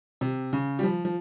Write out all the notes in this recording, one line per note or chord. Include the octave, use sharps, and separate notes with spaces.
C3
C#3
G3
F3
F3